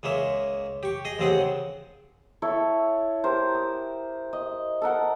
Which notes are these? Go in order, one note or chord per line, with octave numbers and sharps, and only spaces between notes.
C#2 G#3 A#3 C#5 E5
G4 C#6
G#4 D#5
A1 D#2 C#3 C4 G#4 F#5
E4 A4 C#5
G4 A#4 C5
D#6
D#5
A4 A#4 F#5